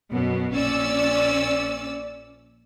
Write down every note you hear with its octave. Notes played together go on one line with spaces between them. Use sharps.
F#2 B2
A#1 C#4 D5 E6